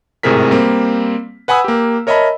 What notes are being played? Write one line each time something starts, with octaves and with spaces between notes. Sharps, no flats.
G#1 A2 C3 G#4 A#4 B6
G3 A#3 C4
B4 F#5 G#5 B5 D#6 E6
A#3 G4
A#4 C#5 D#5 E5 A5 B5